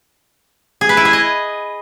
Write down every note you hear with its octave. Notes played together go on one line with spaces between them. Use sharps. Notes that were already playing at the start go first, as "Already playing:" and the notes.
G#4
B4
E4
G#4
D#5